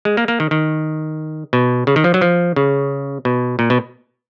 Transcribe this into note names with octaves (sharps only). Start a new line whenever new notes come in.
G#3
A#3
A#3
D#3
D#3
B2
C#3
D#3
F3
F#3
F3
C#3
B2
A#2
B2